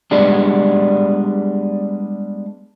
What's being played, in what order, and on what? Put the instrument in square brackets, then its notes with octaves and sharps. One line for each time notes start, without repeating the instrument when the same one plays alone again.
[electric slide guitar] G3 G#3 B3 D4